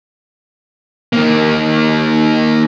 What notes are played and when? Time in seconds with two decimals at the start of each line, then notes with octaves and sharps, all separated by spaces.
1.13 D#3 A#3